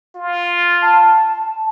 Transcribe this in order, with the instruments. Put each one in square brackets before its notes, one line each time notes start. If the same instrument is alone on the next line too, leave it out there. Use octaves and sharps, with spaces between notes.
[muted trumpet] F4
[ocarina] A5